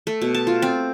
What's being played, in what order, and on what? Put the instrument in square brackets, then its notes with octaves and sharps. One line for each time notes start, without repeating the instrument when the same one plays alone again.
[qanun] A3
B2
A5
F4
C4